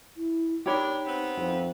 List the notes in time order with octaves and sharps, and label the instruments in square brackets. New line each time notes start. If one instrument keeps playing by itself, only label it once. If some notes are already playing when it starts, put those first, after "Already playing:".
[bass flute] E4
[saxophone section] D#2 D4 [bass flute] D#4 [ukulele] G4 C#5 B5
[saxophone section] B3 C4
[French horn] F2